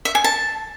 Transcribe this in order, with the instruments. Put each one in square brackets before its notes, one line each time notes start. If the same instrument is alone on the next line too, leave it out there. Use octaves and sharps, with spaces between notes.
[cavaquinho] E5
G#5
A5